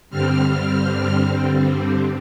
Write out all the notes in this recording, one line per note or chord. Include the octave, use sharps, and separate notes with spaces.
G2 D3 G3 C4 F6